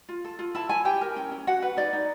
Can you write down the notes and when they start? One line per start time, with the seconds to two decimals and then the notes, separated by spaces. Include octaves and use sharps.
0.09 F4
0.25 A4
0.39 F4
0.55 E4 A5
0.69 E4 G#5
0.85 G4 G5
1.01 A#4
1.16 C#4
1.31 C#4
1.47 F#4 F#5
1.62 B4
1.77 D#4 D5
1.93 D#4